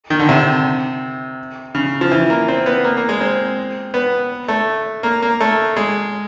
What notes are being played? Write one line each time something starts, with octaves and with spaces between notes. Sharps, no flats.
D#3
D3
C3
C#3
F3
E3
A#3
C4
B3
A#3
A#3
G#3
C4
B3
A3
A#3
A#3
A3
G#3